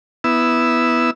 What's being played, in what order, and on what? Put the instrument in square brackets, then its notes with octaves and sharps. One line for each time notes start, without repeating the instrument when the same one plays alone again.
[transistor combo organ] B3 E4 E6